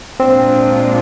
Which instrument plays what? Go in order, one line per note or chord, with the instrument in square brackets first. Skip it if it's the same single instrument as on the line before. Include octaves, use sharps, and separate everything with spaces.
[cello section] A#2 G#3 D4 F4 [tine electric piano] C4